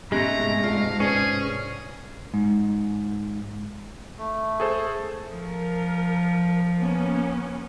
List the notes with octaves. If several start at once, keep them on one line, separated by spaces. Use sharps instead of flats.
G#2 C3 G#3 A3 B3 C#4 G4 A#5
F4 D5 F5 A5
C#4 G#4 B4 C5 D5
G#2
A3
G#4 A4 C5
F3 A#4
A#3 B3 C#4